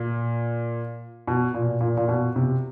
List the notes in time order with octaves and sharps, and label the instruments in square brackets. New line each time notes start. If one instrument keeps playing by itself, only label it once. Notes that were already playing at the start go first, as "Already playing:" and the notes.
Already playing: [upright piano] A#2
B2
A#2
A#2
A#2
B2
C3